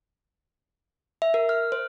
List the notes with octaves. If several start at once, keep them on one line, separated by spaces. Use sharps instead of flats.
E5
A#4
F6
C5